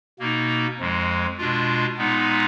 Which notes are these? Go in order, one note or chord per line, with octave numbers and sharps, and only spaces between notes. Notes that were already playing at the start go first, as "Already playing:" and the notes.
B2 A#3 D#4
F2 F3 G#3
B2 G#3 D4 F4
A#2 G#3 B3 D#4